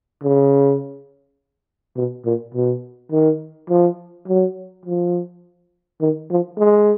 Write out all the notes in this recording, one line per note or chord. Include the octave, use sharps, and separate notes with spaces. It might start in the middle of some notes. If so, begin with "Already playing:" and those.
C#3
B2
A#2
B2
D#3
F3
F#3
F3
D#3
F3
G#3